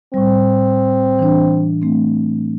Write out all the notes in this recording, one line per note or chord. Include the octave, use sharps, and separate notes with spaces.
A2 G3 C4
E3 D4
A3 C4